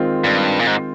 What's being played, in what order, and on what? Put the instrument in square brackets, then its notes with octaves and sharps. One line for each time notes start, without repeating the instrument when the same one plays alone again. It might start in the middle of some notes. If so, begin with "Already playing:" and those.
Already playing: [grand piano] D#3 G#3 C4 F4
[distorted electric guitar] G2
A#2
G#2